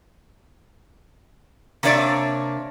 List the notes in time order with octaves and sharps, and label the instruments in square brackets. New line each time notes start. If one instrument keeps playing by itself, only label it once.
[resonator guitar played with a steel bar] C3 A#3 D4 C#5 D5 E5